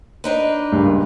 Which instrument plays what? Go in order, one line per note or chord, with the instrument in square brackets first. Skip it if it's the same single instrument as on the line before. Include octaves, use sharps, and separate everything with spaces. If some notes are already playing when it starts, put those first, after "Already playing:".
[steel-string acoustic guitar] D4 D#4 B4
[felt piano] C#2 G2 A#2